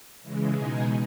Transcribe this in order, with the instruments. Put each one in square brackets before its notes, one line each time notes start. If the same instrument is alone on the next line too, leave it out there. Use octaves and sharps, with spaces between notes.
[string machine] C#3 E3 G#3
B2 G#3 D#4 G#4